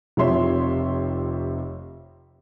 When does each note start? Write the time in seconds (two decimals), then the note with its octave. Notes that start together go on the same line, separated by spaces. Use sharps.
0.17 F1 C3 F4 C#5 E5 C6